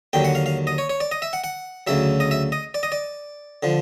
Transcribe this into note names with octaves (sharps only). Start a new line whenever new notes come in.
D#2 D3 F#3 G5
F#5
F5
F5
D#5
C#5
C#5
D5
D#5
E5
F#5
F#5
D2 C#3 F#3 E5
D#5
E5
D#5
D5
D#5
D5
D3 F3